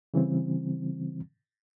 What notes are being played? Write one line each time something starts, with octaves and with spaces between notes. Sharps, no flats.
C#3 E3 G3 C4